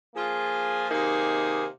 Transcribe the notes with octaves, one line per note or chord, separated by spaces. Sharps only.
F3 A#3 F4 G#4
C3 D#3 A#3 D#4 G#4